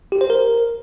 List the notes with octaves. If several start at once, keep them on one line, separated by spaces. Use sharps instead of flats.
G4
C5
A#4